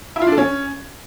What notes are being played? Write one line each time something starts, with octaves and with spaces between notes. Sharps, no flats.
E4
F4
D4
A4
C#4